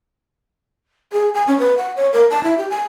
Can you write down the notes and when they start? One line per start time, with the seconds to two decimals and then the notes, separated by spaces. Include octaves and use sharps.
1.12 G#4
1.34 G#5
1.47 C#4
1.59 B4
1.77 F#5
1.96 C#5
2.13 A#4
2.30 A5
2.44 E4
2.58 G4
2.70 G#5